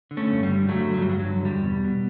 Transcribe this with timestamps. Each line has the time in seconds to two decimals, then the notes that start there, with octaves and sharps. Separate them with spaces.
0.11 D3
0.17 A3 C#4
0.31 G2
0.43 G3
0.49 D3
0.68 D3 F#3 A3
0.88 G2
0.94 F#3
1.02 G3
1.07 G2 F#3
1.19 F#3
1.26 D3
1.45 E2 G3
1.64 B2
1.84 B2